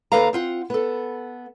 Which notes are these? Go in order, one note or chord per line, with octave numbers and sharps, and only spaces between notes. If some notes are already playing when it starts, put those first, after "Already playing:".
D#2 A#3 A4 B4 F5 A#5
C4 F4 F#5
B3 A4